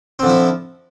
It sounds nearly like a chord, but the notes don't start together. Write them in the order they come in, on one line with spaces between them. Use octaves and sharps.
C4 D3 F3 E4